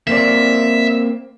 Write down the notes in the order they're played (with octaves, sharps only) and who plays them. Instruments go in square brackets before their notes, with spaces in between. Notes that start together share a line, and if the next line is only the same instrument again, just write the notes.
[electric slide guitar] A#3 C4 D5 [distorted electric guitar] E5